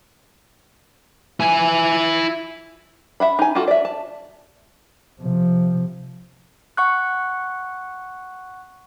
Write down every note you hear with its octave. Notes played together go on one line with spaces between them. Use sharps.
E4 G#5
E5 F#5 B5
D#4 G#5
F4 F#4 A4
D5 E5
A5
C3 F3
F#5 C#6 F#6